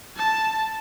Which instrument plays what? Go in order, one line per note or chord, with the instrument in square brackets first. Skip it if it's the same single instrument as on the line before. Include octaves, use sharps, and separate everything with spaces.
[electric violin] A5